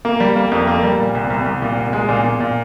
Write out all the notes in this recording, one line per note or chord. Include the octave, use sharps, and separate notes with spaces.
A#3
G3
A#3
F2
A#3
G3
A#2
C2
C2
C2
A#2
C2
G#3
A#2
A#2
A#2